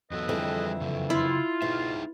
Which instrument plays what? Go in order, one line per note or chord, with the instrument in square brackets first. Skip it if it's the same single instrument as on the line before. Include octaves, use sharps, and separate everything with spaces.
[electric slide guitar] E2 F#3 B3 [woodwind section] A4 B4 D#5
[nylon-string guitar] F2 D3 E3 [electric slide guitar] G3 G#4 G5
[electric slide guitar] C#3 F#3
[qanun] E4 [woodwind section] F4
[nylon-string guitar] B2 [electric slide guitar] D#4 G#4 E5